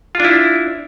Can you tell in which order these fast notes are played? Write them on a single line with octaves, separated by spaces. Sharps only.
F4 D4 E4